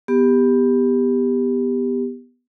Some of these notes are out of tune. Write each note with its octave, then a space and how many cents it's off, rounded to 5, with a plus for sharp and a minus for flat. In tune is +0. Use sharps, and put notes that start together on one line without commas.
B3 +0 G4 +15